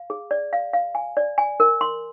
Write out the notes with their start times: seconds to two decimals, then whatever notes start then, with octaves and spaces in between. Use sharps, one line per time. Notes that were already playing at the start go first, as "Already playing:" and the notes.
Already playing: F5
0.10 G#4
0.31 D5
0.53 F5
0.73 F5
0.95 G#5
1.17 D5
1.38 G#5
1.60 A#4
1.81 C6